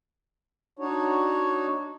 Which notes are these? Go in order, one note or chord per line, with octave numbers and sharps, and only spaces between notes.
D4 D#4 F#4 C#5